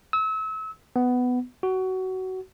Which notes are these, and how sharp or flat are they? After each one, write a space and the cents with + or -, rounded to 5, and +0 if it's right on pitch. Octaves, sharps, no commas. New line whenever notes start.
E6 -35
B3 +10
F#4 +20